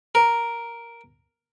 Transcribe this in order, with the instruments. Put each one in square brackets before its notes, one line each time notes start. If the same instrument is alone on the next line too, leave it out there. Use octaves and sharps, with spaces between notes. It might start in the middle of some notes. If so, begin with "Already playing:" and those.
[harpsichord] A#4